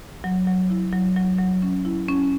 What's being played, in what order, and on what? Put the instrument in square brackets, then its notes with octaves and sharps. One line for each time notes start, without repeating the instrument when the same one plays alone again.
[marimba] F#3
F#3
E4
F#3
F#3
F#3
C#4
E4
C#4